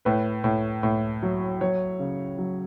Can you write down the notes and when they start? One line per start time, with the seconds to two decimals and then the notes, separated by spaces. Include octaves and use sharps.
0.05 A2 B4
0.44 A2
0.83 A2
1.23 F#3
1.61 F#3 C#5
2.00 C#3
2.38 F#3